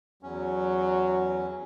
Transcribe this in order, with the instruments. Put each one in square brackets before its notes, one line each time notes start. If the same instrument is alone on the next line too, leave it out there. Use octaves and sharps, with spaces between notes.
[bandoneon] E2 C#4 [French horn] F#3